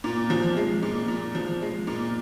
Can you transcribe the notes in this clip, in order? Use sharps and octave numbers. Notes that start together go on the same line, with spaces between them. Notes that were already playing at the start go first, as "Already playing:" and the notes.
A#2
F3
G#3
A#2
A#2
F3
G#3
A#2